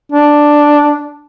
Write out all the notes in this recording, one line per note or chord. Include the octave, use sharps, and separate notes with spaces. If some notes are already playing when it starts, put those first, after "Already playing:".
D4